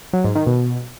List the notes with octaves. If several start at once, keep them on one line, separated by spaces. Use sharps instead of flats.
F#3
G#2
D#3
B2